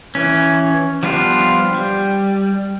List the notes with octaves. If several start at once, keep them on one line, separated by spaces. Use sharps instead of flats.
E3 C#4
F3 G3 B3 D4 F4
G3